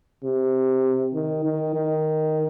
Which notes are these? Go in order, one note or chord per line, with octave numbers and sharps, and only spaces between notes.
C3
D#3
D#3
D#3